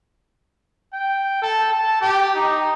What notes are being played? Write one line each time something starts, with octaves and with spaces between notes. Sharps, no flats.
G5
A4
A5
G4
D#4